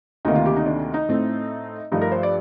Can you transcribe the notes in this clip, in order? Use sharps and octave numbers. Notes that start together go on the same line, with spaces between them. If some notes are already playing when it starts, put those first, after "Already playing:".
D2 C3 D#3 A#3 D#4
F4
G4
D#4
D4
D#4
A2 A3 C4
G2 F3 A3 D#4
A#4
C5
D5